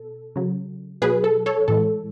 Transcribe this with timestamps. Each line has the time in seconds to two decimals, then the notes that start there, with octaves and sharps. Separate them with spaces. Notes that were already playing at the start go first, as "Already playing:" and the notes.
Already playing: B2 A4
0.36 C#3 F#3
1.02 B2 F#3 G#4 B4
1.24 A4
1.46 A4 C#5
1.68 A2 E3 G#3 A4